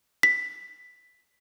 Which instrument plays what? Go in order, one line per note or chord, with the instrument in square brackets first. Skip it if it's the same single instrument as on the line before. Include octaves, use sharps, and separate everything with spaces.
[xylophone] B6